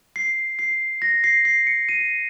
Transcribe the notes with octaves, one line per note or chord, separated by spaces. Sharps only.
C7
C7
A#6
C7
C7
C#7
D#7